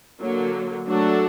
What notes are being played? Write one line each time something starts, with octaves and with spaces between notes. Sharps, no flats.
D3 F#3 A#3
F#3 A3 D4 F#4 A4